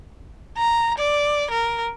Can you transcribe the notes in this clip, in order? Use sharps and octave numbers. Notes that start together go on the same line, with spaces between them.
A#5
D5
A#4